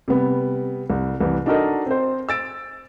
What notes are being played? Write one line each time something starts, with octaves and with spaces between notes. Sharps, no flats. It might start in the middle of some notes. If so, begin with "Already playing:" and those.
C3 G3 B3
C2
C2 E3
D4 D#4 F#4 A4 A#4 D#5
C4 C5
E6 A6 D7